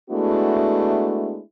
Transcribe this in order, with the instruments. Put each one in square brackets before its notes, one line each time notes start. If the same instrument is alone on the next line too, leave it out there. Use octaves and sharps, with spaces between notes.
[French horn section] G#3 A3 B3 D4 E4 F#4